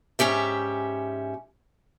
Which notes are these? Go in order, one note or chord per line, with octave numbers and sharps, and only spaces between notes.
G#2 C#4 G4 E5